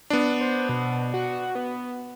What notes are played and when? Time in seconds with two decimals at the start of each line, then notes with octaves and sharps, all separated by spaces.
0.10 B3 D4
0.41 C5
0.69 B2
1.14 F#4
1.55 B3